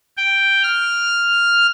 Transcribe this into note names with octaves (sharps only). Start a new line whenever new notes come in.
G5
F6